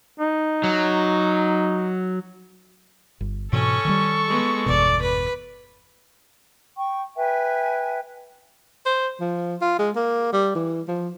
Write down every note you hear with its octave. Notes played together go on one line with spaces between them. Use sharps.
D#4
F#3
G1
G#2 B2 E3 C#4 A4 C#6
D#3 F#3 G3
G#3 B3
G1 E2 B2 D5
B4
G5 C#6
B4 E5 G5 G#5
C5
F3
F4
G#3
A#3
G3
E3
F3